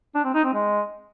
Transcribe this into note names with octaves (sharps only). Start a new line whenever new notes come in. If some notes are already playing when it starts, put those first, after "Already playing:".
D4
C4
D#4
C4
G#3